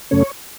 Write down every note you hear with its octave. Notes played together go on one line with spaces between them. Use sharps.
F#2 C#3 A3 C#4 C#5